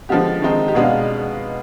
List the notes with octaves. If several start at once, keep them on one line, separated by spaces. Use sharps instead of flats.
D3 F3 G#3 B3 G4
D#3 G#3 C4 D#4
G4
B2 G#3 B3 D4 G#4
F5